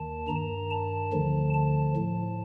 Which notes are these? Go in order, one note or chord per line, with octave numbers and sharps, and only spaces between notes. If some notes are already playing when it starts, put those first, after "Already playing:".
Already playing: D#2 D#3 A5
G2 D#3 A#5
A5
D2 D3 F3
A5
A2 F3